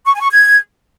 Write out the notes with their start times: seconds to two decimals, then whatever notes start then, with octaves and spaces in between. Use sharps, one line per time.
0.06 C#6
0.14 G#5
0.22 C#6
0.30 G#6